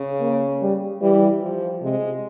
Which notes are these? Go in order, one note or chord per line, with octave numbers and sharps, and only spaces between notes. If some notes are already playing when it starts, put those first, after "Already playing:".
Already playing: C#3
A#3
G3
E3 G3
F3
C3 G#3